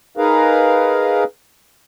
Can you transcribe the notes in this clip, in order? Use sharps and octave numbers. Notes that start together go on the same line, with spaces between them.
D#4 G#4 A#4 B4 F5